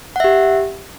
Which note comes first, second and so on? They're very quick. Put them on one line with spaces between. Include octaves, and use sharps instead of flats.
F#5 E5 G4